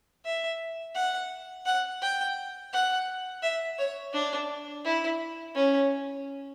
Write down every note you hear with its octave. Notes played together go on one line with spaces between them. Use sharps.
E5
F#5
F#5
G5
F#5
E5
C#5
D4
E4
C#4